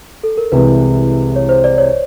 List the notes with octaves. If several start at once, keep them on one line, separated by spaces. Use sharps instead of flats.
A4
A#4
C2 C3 E3 G#3 B4
C#5
C5
C5 D5
C#5